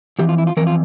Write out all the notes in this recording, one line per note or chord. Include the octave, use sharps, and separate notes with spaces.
F2 E3 G4
F4
E4
F4
F2 E3 A#4
F4